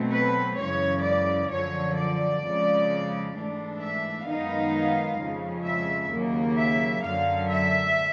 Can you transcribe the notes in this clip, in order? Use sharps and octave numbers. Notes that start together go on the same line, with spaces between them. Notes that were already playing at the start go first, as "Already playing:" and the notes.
Already playing: B2 F#3 A3 C4
B4
F#2 C#3 E3 G#3 C#5
D5
F#2 D3 F3 C#5
D5
F2 C#3 F3 G#3
G#2 E3 A3 D4
E5
F#2 D#3 G#3 B3 D#4 F5
F2 C#3 F3 G#3
E5
D#2 C#3 F#3 A#3
E5
F#2 D3 F#3 F5
E5